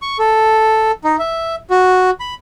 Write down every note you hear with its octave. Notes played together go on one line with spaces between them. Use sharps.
C#6
A4
D#4
E5
F#4
B5